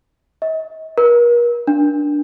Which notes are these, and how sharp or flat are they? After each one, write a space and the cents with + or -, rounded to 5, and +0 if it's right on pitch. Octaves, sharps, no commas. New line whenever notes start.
D#5 +40
A#4 +40
D4 +0